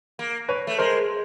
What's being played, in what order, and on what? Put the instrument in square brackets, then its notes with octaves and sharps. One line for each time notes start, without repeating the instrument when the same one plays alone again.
[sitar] A#3
[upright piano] B4 C#5
[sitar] A3
[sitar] G#3 [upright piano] A#4 C5